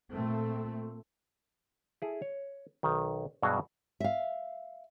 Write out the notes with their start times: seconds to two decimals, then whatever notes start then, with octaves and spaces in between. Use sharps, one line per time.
0.11 A#2 A3 C4
2.02 E4 G#4 A4
2.22 C#5
2.83 B1 D#3
3.42 G2 B2 F#3 F#4 G#4
4.00 E5 F5